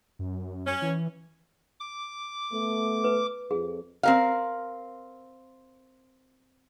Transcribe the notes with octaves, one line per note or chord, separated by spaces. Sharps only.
F#2
C#4
E3
D6
A3 B3
B4
F2 G#4
C4 A#4 F5